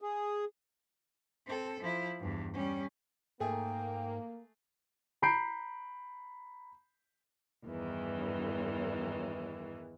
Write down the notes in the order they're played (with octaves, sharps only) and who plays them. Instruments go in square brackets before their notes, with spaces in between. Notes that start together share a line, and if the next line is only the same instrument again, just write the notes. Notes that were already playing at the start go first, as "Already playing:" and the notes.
[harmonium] G#4
[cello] C4 A4
F3 E4
E2 G2
G3 C#4
[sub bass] G#2 [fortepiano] A3 G#4 [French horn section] A#3 [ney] G5
[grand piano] A#5 B5 G6 C7 D7
[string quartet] E2 G2 D#3 E3